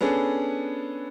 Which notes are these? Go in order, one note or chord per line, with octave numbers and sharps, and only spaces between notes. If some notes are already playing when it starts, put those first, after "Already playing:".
B3 C#4 D4 G#4 A4